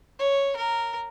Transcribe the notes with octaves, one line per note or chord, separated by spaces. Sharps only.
C#5
A#4